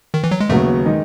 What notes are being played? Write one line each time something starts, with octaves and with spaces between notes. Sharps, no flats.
D#3
E3
F#3
G#3
D#2 C#3 F#3 A3 B3 F#4
D#3 G#3 D#4